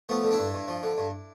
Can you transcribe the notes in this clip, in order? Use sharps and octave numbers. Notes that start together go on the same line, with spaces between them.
F3 A3 B3
D3
D4 E4
G2
G2
F3
D3
G2